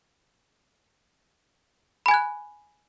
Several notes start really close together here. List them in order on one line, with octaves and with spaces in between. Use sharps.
B5 G#5 G#6 F#6